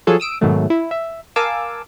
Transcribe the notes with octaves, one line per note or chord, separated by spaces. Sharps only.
F3 F#3 F4 G#4 A4 C#5
D#6 E6 D7
G#2 B2 D#3 F#3 A3
E4
E5
A#4 F5 G#5 A5 D6 E6